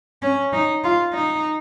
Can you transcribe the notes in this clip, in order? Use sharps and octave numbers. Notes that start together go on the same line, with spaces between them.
C#4
D#4
F4
D#4